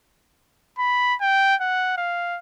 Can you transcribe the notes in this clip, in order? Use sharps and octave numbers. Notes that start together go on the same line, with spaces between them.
B5
G5
F#5
F5